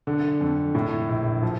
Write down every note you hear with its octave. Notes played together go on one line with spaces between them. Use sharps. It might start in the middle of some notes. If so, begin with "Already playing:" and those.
D3
F2
A2
A#1
F3